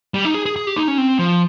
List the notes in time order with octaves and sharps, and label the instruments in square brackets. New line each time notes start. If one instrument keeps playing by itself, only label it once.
[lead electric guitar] G3
D#4
G#4
G#4
G#4
G4
D#4
C#4
C4
F3